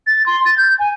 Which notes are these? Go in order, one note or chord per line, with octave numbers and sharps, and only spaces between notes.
A6
C6
A6
G6
G#5